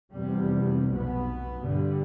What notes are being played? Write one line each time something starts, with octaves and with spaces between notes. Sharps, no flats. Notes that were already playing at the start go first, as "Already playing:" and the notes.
F1 E2 C3 G3
B1 B2 B3
G2 D3 G3